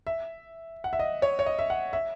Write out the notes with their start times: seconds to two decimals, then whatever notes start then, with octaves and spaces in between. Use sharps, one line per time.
0.07 E5
0.84 F#5
0.93 E5
0.99 D#5
1.22 C#5
1.39 C#5
1.46 D#5
1.59 E5
1.70 F#5
1.93 E5